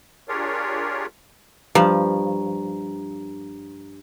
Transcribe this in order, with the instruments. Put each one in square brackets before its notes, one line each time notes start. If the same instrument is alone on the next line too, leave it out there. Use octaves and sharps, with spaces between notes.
[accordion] D4 F4 G4 G#4 A#4 C#5
[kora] G2 [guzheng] F3 [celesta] A#5